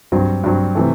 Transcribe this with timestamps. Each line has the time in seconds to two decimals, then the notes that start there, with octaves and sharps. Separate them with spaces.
0.12 G2 F#3 C4
0.43 G2 F#3 C4
0.75 C3 E3 A3